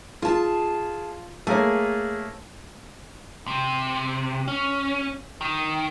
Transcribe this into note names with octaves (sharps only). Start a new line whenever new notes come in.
F4 G#4 A5
A3 A#3 G#4 C#5
C3
C#4
D#3